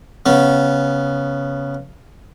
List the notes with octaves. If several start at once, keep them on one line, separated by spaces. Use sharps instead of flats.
C#3 B3